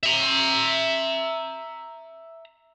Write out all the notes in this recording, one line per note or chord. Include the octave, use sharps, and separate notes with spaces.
E5 A#5